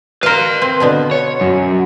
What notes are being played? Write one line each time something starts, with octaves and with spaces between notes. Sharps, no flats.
A#4 B4 F5 C6
C4
B2 D3 B3
C#5
F#2